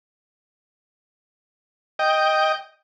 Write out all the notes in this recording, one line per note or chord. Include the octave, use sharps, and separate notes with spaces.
D#5 G5